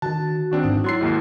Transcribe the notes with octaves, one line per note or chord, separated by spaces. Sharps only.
D3 D#3 F#4 A5
D#3 C4 D4 F#4
G#2 E3 D#4
F#3 E4 C6 F#6 A6 C7
D#2 G#2